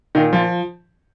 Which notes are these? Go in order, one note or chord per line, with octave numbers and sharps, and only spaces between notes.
A#2 D#3 D#4
F3 F4